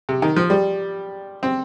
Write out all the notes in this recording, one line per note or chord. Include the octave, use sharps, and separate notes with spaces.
C3
D#3
F3
G3
C4